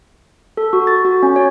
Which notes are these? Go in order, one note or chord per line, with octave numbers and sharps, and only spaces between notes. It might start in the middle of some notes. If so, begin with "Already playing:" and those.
A4
F#4
A6
F#4
C#4
C#5